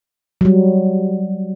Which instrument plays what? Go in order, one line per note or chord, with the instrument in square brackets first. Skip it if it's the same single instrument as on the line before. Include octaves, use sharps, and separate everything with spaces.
[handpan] F#3 G3